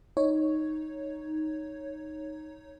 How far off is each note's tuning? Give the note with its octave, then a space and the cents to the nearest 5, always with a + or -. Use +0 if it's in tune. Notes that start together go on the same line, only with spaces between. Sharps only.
D#4 +0 C#5 +0